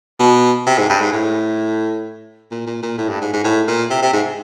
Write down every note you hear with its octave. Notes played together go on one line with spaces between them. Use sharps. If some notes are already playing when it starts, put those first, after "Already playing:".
B2
C3
G#2
G2
G#2
A2
A#2
A#2
A#2
A2
G2
G#2
G#2
A2
A#2
C3
C3
G#2